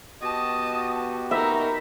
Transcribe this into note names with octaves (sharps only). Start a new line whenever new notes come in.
B3 F#4 G4 D#5 A5
D#4 A#4 E5 B5